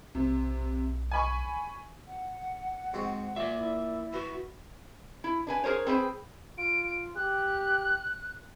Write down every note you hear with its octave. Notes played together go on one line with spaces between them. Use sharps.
B1 C3
G#5 B5 C#6
F#5
G#2 C4 F#4
A#2 D5 E5
E4
B3 F#4
E4
D4 B4 G#5
G#4 A#4 C5 C#5
C4 G#4 B4 C5 G5
F4 D7
G4 F#6